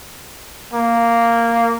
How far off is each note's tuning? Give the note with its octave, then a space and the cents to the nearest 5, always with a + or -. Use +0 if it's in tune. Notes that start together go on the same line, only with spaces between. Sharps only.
A#3 -5